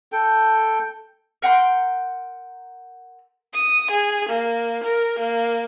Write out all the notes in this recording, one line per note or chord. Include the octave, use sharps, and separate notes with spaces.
A4 G5
A#4 F#5 G5 C6
D#6
G#4
A#3
A#4
A#3